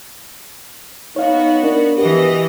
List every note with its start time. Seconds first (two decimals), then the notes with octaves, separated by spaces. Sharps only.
1.16 B3 D#4 F#4 C#5 F5
1.64 D4 A#4
1.98 B2 E3 G4 D#5